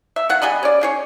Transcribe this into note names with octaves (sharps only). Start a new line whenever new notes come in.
E5
D#3 F#5
G3 G#4 D#5 B5
C#4 D5
D#4 G#4 C#5